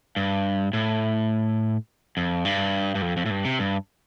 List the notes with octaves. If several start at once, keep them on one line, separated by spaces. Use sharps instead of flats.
G2
A2
F2
G2
G2
F2
F2
A2
G2
C3
G2